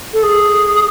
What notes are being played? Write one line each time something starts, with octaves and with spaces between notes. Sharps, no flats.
A4
G#4